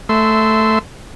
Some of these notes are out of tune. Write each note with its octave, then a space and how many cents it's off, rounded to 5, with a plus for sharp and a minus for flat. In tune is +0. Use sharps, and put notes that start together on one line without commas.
A3 +0 E5 -10 C6 -20